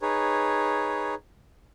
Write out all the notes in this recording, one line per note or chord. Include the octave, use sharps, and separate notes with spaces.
D#4 G#4 B4 C#5